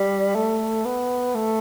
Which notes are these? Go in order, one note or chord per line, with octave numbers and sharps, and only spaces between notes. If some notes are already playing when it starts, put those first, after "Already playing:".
Already playing: G3
A3
B3
A3